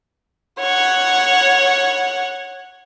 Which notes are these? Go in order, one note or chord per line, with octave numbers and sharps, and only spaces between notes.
C#5 F#5